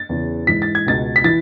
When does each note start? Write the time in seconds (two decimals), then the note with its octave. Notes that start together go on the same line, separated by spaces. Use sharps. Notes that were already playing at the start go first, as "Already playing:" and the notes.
Already playing: A6
0.09 E2 C#3 E3
0.47 G#2 E3 B6
0.62 A6
0.75 G#6
0.86 C#2 B2 A6
1.16 B6
1.24 E3 A6